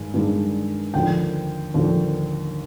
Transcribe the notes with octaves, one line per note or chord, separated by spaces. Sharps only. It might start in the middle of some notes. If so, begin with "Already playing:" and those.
Already playing: G2 D#3 G#3 D4
G2 D#3 G#3 D4
D#2 D3 F3 G5
D#2 D3 F3